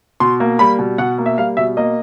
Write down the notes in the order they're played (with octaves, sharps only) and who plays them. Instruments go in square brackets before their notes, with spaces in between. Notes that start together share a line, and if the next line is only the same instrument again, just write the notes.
[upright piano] B2 C6
A#3
G3 B5
B2
B2 F#5
A#3
E5
G3 F5
B2 E5
A#3 D#5